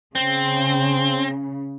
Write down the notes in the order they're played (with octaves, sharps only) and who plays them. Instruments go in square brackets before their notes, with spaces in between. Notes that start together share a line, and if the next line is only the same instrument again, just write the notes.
[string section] C#3 [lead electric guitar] C4